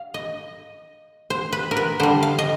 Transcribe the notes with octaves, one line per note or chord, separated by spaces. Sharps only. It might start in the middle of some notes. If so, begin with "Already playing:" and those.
Already playing: F5
D#5
C5
B4
A#4
B4
D3 G3 C5
F5
D#5